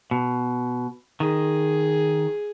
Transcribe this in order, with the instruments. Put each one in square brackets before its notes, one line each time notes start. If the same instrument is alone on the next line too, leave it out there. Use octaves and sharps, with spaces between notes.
[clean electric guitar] B2
[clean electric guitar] D#3 [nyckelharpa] G#4